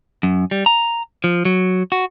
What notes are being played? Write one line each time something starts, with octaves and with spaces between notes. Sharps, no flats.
F#2
G3
A#5
F3
F#3
F#4